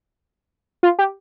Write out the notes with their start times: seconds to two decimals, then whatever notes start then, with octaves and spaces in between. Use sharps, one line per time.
0.83 F4
0.99 G4